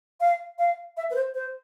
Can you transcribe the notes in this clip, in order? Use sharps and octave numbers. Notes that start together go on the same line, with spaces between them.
F5
F5
E5
B4
C5
C5